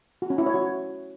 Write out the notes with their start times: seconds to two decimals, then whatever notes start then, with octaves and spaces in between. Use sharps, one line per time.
0.22 F#4
0.30 C#4
0.38 E4
0.46 C#5
0.54 F#4